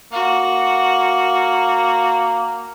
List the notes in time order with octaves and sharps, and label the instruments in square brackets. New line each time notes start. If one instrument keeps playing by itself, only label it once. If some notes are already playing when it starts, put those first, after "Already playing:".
[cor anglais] A#3 [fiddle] F#4